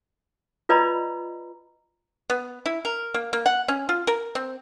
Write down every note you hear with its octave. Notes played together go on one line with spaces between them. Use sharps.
F4 B4 D5 D#5 A#5 B5
B3
E4
A#4
A#3
A#3
F#5
C#4
F4
A#4
C4